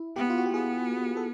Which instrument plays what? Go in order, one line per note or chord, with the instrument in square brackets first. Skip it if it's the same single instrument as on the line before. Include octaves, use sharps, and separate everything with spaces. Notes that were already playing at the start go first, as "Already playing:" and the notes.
Already playing: [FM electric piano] E4
[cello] B3 [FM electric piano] G4
[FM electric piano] F4
F#4
G4
[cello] B3 [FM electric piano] G#4
[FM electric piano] A4